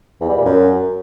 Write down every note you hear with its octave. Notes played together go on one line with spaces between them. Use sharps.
E2
G3
A#2
F#2